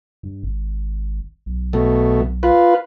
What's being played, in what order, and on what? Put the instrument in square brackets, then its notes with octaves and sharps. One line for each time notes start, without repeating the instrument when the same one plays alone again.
[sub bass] G2
G#1
B1
[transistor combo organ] B2 A3
F4 B4